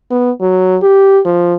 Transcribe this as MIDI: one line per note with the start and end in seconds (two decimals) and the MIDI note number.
0.11 0.31 59
0.40 0.77 54
0.82 1.19 67
1.25 1.54 53